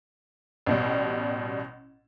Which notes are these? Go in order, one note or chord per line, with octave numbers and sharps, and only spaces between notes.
A1 B2 G3